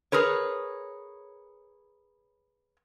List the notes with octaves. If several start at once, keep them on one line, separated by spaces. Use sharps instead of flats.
G#4 A#4 B4 C#5